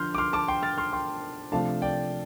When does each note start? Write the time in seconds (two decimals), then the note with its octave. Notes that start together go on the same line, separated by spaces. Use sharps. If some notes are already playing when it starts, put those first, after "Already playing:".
Already playing: D3 F3 C6 F6 G6
0.15 D6
0.18 C6 F6
0.33 A5 D6
0.48 G5 C6
0.63 F6 A6
0.78 C6 F6
0.93 G5 C6
1.52 C3 F3 A3 D4 F5 A5
1.82 D5 G5